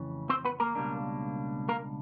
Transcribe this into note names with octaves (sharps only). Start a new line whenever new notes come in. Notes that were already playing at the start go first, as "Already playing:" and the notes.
Already playing: F2 C#3 E3 A3 C#4
C4 C5
B3 B4
A#3 A#4
C#2 B2 G3 A#3 D4
A#3 A#4